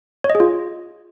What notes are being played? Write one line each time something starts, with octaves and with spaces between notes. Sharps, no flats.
C#5
D#5
G#4
F4